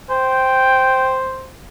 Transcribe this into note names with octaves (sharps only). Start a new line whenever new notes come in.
C5 G5